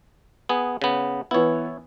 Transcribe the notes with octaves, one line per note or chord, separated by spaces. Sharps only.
B3 G#4
C#3 B3
E3 B3 E4 C#5